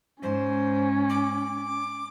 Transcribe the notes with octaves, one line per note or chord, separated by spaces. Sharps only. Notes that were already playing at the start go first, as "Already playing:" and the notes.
G#2 C#4 C5
D6